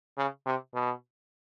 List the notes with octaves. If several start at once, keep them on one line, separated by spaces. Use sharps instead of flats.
C#3
C3
B2